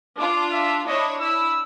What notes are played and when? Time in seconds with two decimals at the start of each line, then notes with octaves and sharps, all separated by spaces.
0.18 D4 F4 D6
0.51 E5
0.87 D4 E4 C#5 D#5
1.21 E4 E6